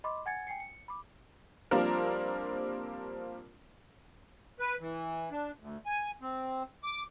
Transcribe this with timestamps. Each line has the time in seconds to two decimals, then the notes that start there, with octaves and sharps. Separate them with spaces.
0.04 D#5 B5 C6 D6
0.26 F#5 G#5 G#6 A6 C#7
0.47 G5 G#5 C7 C#7
0.60 C#7
0.88 B5 D6
1.71 F3 G3 A#3 C4 D4 A#4
4.60 B4
4.80 E3
5.31 D4
5.60 D2
5.86 G#5
6.22 C4
6.83 D6